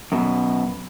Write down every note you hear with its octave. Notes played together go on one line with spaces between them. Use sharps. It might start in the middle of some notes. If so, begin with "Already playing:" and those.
F#2 B2